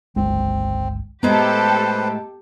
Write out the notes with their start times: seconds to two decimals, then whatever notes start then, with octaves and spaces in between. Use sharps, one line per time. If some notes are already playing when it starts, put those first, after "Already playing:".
0.16 G1 C#2 G#3 C4
1.23 A2 G#3 B3 G4 A4 B4 C5 A#5